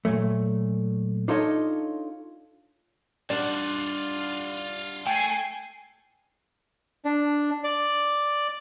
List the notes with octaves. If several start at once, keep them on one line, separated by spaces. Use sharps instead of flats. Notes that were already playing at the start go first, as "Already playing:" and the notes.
A#2 E3 F#3 A3
D4 D#4 F4 A4 C#5 D#5
G3 D4 F4 D5 F#5
A3 A4 G5 G#5 C7
D4
D5